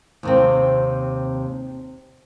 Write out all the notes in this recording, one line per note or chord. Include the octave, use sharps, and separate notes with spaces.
D#2 C3 C4